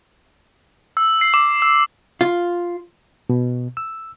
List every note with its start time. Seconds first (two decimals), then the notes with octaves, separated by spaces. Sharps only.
0.97 E6
1.21 C7
1.34 D6
1.62 E6
2.21 F4
3.30 B2
3.77 E6